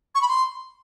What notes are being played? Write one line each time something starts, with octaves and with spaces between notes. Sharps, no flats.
C#6
B5
C6